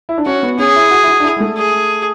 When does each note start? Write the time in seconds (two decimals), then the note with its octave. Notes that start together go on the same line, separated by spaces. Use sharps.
0.09 E4
0.18 D4
0.25 C#4 F#4
0.43 B3
0.59 C#4 G#4
0.76 E4
0.91 F#4
1.03 E4
1.08 F#4
1.20 D4
1.24 E4
1.36 G#3
1.40 A3
1.57 G#4